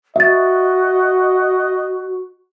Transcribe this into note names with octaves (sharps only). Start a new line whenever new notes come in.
F#4 D#5 E5 A6